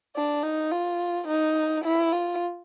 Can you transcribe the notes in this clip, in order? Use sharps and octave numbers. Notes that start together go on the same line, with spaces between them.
D4
D#4
F4
D#4
E4
F4